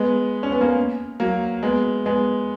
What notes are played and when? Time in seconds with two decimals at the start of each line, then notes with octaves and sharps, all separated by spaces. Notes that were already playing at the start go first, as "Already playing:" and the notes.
Already playing: G#3 B3
0.43 C#4
0.52 B3
0.61 A#3 C#4
1.20 F#3 A#3
1.63 G#3 B3
2.05 G#3 B3